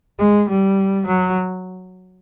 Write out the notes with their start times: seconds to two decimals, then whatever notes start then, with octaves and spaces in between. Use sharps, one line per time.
0.19 G#3
0.49 G3
1.06 F#3